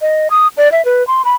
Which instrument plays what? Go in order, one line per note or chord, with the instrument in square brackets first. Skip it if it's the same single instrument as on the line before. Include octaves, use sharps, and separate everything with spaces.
[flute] D#5
D#6
D5
E5
B4
C6
B5